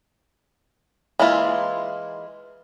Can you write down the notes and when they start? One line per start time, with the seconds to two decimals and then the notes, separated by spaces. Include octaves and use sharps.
1.19 E3 G#3 A#3 E4 F4